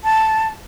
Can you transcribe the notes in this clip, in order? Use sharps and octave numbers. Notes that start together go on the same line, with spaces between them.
A5